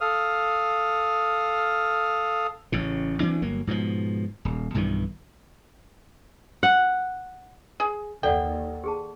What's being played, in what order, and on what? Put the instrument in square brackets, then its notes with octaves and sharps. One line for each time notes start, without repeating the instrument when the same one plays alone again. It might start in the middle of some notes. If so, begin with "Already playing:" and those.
[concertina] A4 F5 D#6 F6
[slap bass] A1 A2 C#3
D2 E3 C4 D4
G1 F#3 A#3
G#2 B2 E3 F3
D#1
B1 G2 D#3 E3
[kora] F#5
[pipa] G#4
[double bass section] D#2 [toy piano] A4 D5 F#5 [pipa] G5
[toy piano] G4 G#4 A5